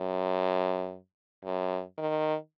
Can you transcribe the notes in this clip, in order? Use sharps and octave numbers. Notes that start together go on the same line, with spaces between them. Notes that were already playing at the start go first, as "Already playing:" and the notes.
Already playing: F#2
F#2
D#3